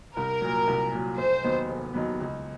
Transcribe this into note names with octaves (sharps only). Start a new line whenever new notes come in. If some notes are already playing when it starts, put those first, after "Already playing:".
C2 A#4
A#2 F#3
C2
A#2 F#3
F1 C5
D#2 D#3 F#3 B3
F1
D#2 D#3 F#3 B3
C#2